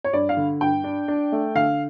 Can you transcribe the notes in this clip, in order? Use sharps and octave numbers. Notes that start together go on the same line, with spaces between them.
C#5
G2 D5
F5
D3
G2 G5
D4
D4
A3
D3 F5